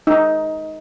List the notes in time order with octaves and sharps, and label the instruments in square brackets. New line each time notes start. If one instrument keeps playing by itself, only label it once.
[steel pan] D#4